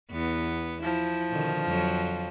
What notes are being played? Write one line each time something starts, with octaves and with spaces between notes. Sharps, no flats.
E2 B3
F3 E4
B2 D3 D#3
F2 F#3